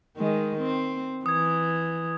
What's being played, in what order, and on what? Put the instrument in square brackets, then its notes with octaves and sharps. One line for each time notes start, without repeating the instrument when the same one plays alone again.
[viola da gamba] D#3 G#3
C4
[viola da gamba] E3 [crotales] D#6 G#6